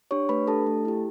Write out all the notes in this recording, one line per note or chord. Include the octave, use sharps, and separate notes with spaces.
D4 G4 C#5 C#6
A3 B4 B5
D4 G4 A4 A5
A3
E4 G4